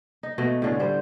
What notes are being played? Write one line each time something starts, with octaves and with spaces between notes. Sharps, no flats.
D#4
B2 A3 D#5
A2 D3 C#4
G3 C5